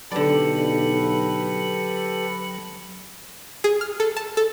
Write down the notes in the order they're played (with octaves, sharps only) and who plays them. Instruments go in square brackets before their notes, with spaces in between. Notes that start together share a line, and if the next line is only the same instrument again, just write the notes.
[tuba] B1 [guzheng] D3 D5 [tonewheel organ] F#3 [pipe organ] G4 A4 B4
[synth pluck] G#4
F6
A4
A5
A4